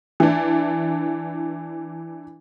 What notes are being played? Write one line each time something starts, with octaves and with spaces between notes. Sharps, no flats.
E3 D4